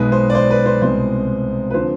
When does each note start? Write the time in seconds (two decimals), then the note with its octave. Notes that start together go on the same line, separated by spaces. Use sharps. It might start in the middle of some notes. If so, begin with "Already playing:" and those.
Already playing: B1 B2 G#3 B4
0.12 C5
0.30 D5
0.35 C5
0.50 B4
0.66 C5
0.82 C2 B2 G#3 C4 C5
1.70 B4
1.74 D3 F3 C4 C5